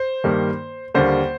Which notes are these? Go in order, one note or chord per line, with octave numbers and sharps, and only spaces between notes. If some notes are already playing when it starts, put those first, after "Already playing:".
Already playing: C5
G2 D#3 G3 A#3
D#2 D3 G3 A#3 C5